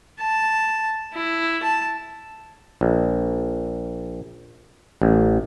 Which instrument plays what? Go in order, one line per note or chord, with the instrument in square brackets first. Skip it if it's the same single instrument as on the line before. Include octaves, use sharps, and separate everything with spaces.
[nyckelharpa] A5
E4
A5
[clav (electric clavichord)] A#1
A1